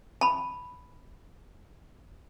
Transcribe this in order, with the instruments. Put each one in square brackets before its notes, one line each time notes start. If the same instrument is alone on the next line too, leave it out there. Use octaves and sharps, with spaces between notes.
[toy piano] A5 B5